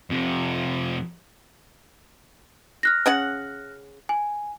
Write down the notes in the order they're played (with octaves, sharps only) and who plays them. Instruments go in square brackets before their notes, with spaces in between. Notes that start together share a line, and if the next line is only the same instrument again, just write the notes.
[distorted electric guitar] F2 C3
[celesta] F6 F#6 A#6
[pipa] C#3 C#4 F#5
[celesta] G#5